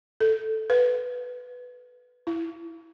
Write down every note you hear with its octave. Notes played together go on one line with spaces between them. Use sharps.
A4
B4
E4